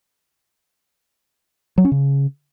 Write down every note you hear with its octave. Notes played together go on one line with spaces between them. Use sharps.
F#3
C#4
C#3